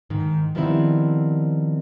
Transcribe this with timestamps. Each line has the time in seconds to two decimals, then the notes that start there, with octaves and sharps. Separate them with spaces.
0.10 G#2 D#3
0.55 D#3 F3 G3 B3 C4 E4